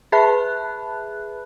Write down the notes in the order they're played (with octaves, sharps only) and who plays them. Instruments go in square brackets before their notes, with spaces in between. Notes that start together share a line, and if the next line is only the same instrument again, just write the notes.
[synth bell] G#4 B4 E5 A5 B5 F#6